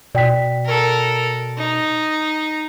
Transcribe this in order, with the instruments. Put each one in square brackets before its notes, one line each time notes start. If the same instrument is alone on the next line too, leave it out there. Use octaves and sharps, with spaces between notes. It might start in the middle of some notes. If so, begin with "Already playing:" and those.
[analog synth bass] B2 [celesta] D5 G5 B6
[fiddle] A4 A#4
D#4